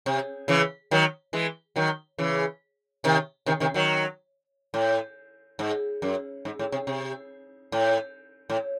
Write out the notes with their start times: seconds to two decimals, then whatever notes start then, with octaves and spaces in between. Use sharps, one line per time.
0.06 C3
0.48 C#3 E3
0.91 D#3 F#3
1.33 E3 G#3
1.76 D#3 F#3
2.18 C#3 E3
3.04 C3 D#3
3.46 C3 D#3
3.60 C3 D#3
3.74 D#3 F#3
4.74 A2
5.59 G#2
6.02 F#2
6.45 G#2
6.59 A2
6.72 C3
6.87 C3
7.72 A2
8.50 A2